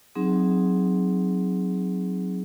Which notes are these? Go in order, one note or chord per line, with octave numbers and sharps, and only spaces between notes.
F#3 C4 D#4 G#4